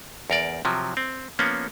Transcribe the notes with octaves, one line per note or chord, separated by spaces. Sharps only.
E2 A#4 D5
C3 F3 F#3
C4
F3 A#3 B3 C#4